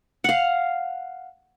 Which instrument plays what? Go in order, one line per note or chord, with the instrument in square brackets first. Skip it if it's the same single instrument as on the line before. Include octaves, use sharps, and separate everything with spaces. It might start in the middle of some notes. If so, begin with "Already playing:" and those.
[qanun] F5 F#5